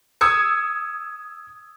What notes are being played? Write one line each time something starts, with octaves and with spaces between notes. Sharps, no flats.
D#6 E6 G#6 C#7